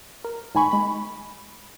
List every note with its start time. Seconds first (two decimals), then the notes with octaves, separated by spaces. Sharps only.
0.25 A#4
0.55 G#2 D#3 G#5 B5 C#6
0.71 G#3 B5